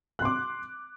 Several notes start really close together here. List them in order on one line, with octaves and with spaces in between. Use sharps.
F#6 C6 D6